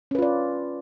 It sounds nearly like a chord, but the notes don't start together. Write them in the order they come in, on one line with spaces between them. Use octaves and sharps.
C#4 B4 F4 D5